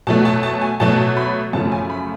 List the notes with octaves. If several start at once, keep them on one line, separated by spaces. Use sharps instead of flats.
B2 F#3 A3 A5
A5
A5
G#5
B2 F#3 A3 A5
B5
F#2 C#3 F3 A3 A5
G#5
B5